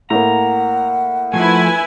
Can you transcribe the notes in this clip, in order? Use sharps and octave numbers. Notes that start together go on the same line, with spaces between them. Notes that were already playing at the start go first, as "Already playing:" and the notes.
A2 A#3 F#5 A#5
F3 A3 E4 B4 G#5